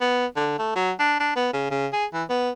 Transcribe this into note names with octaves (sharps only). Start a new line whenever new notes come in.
B3
D3
A3
F#3
D4
D4
B3
C#3
C#3
G#4
E3
B3